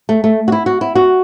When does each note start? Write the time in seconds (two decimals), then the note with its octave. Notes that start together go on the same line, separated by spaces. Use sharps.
0.09 A3
0.24 A3
0.48 F#4
0.52 E4
0.66 F#4
0.81 E4
0.95 F#4